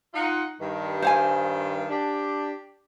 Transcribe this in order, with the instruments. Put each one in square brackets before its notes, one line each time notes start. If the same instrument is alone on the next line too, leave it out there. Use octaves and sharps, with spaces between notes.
[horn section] D#4 F4 F#5
G2 D#3
[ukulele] C5 F5 G#5
[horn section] D4 G4